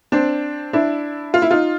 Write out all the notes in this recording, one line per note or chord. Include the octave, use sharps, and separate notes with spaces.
C4 D4
D4 E4
F4
E4
D#4 F4